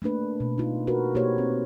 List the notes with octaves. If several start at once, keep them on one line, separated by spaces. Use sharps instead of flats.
A3 A#3 D4 B4
B2
D#4 F4
F#4 A#4 B4
B2 A#3 F#4 G4 C5 C#5
C4